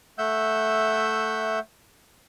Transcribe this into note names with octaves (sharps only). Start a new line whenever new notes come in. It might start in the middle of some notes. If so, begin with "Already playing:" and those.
A3 E5 F#5 E6 G6